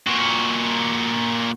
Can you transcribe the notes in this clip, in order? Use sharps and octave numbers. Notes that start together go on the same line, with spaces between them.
A#2 F#4